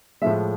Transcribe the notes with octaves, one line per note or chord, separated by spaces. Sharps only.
A2 F3 G#3 E5